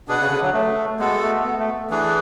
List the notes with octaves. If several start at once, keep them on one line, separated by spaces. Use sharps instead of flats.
B2 D4 G#4 B4 F#5
C#3
D3
F#3
A3
G#3 B3 F#4 A4
A3
B3
A3
E3 A3 D4 G#4 B4